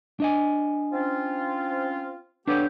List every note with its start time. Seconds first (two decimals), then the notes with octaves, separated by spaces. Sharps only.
0.20 D4 D#5 G#5
0.93 C4 C#4 F4
2.47 B3 D4 G4 A4 C#5